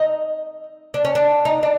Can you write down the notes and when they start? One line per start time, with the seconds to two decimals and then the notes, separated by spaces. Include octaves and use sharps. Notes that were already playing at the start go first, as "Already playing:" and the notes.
Already playing: D#4
0.94 D4
1.05 C#4
1.15 D4
1.45 D#4
1.63 D4